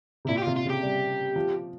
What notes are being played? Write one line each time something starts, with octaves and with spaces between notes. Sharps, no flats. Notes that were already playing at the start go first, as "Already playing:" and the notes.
C3
A#2 E4
G4
F4
C3
F4
C#3
G4
G3
F3